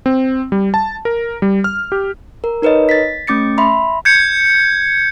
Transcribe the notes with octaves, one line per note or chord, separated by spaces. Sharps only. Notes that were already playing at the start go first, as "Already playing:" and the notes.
C4
G3
A5
A#4
G3
F6
G4
A#4
D#4 A#4 B4 C#5 D#5
A6 B6
A3 C#4 D6 A6 C#7
E5 B5 C6
G6 G#6 C#7